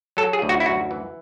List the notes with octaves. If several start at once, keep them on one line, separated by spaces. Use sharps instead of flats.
F#3 A4
G#4
D2
F#4
E4
F#2 F#4
E3